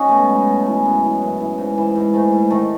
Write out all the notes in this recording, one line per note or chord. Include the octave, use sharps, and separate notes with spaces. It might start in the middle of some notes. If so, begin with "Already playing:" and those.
Already playing: C#4 D#4 F#4
B2 A3
G#3 B3
F#3
A3
B2
A3
E3 G#3
F#2
E3
F#2
E3
G#2
E3
G#2
G#2 A3
G#2
D#3 A3